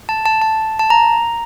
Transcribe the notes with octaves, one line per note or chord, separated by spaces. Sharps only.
A5
A5
A5
A5
A#5